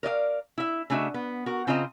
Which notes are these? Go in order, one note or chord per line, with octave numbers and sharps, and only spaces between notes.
A#4 D5 D#5 F5
E4 E5
C#3 A3 D4 F#4 D#5 E5
B3
F#4 A#4
C#3 C4 F4 C5 D#5 A#5